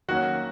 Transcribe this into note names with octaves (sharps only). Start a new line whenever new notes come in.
D#3 F#3 A#3 C#4 F#4 F#5